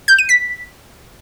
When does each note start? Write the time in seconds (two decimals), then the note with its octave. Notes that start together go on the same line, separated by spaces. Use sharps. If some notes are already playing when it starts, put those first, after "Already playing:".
0.08 G6
0.18 D#7
0.29 B6